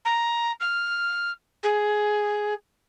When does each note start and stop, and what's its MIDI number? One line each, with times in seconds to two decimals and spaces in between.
0.05 0.51 82
0.60 1.31 89
1.63 2.53 68